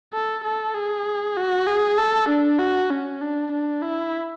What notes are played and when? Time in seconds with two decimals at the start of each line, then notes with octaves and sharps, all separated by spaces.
0.14 A4
0.44 A4
0.75 G#4
1.37 F#4
1.67 G#4
1.98 A4
2.29 D4
2.59 F#4
2.91 C#4
3.22 D4
3.52 D4
3.83 E4